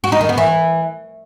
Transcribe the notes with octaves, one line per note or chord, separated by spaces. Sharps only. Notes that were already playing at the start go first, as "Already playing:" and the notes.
F#4
D#4
D#3
B3
E3